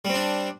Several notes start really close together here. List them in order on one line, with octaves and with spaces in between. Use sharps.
G3 C4 D4